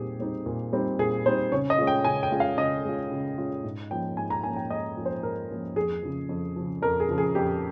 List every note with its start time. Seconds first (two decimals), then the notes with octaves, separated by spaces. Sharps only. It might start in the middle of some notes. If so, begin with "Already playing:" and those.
Already playing: A#2 G3 C4 D#4 G4 G#4
0.19 G3 C4 D#4
0.46 A#2
0.73 G3 C4 D#4
0.99 A#2 G#4
1.26 G3 C4 D#4 C5
1.52 C#3 C#5
1.70 D#5
1.78 G#3 C#4 F4
1.87 G5
2.04 C#3 G#5
2.23 G5
2.32 G#3 C#4 F4
2.40 F5
2.58 C#3 D#5
2.84 G#3 C#4 F4
3.12 C#3
3.38 G#3 C#4 F4
3.64 G#2
3.90 F3 A#3 C#4 G5
4.17 G#2 G#5
4.30 A#5
4.44 F3 A#3 C#4 G#5
4.56 G5
4.70 G#2 D#5
4.97 F3 A#3 C#4
5.06 C5
5.23 G#2 A#4
5.50 F3 A#3 C#4
5.76 F2 G#4
6.03 C#3 F3
6.29 F2
6.56 C#3 F3
6.82 F2 A#4
7.00 G#4
7.08 C#3 F3
7.18 G#4
7.35 F2 G4